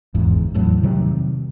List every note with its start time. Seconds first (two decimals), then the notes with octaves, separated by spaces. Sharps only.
0.15 G1 E2 G#2
0.54 E2 A2 F#3
0.83 C3 D#3 F#3 G3